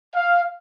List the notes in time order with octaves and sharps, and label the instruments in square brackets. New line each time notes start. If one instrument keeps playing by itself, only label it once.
[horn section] F5